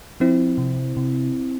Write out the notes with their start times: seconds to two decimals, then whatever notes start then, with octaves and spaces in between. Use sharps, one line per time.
0.20 F3 C4 E4
0.58 C3
0.97 C3